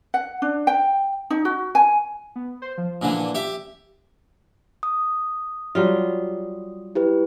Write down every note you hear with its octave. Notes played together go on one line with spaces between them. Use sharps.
F#5
D4
G5
D#4
F#4
G#5
B3
C5
F3
A#2 D3 E3
G4 E5
D#6
F#3 G3 F4
E4 G4 B4